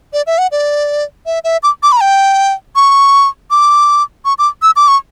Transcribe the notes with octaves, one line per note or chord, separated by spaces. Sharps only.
D5
E5
F#5
D5
E5
E5
D6
D6
B5
A#5
G5
C#6
D6
C#6
D6
E6
D6
C#6